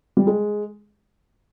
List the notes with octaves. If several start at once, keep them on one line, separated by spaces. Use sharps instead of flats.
G3
G#3